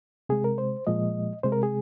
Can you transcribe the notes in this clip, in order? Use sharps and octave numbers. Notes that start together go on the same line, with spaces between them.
C3 G#3 G#4
A#4
C5
A#2 F3 G#3 D#5
C3 G#3 C5
A#4
G#4